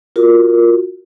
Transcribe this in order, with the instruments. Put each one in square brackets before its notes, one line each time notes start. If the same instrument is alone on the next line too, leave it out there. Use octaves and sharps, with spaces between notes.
[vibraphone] F4 F#4 A#4